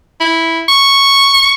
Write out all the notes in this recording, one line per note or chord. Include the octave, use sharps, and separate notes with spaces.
E4
C#6